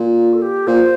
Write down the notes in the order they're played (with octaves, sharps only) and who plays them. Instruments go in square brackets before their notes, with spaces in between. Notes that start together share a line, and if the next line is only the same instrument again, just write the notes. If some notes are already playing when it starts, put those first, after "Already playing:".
Already playing: [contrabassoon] A#2
[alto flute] F4
A4
G4
[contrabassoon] A#2 [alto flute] C5